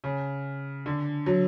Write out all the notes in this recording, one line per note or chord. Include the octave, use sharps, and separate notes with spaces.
C#3
D3
F#3